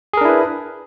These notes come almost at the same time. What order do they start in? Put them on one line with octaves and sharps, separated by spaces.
G#4 A#4 D4 E4 B4